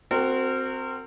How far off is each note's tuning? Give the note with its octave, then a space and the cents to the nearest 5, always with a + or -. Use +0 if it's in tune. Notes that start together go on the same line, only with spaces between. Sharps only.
C4 +0 F#4 +0 A#4 -35